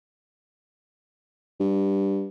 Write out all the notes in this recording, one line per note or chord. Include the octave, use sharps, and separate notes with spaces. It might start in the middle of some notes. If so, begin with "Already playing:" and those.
G2